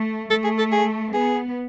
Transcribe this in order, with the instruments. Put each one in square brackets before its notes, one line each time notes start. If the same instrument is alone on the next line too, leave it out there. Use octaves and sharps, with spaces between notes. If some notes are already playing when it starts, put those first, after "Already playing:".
Already playing: [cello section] A3
[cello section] A3 [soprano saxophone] A4
[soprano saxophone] G#4
A4
G#4
[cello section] B3 [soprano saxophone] G#4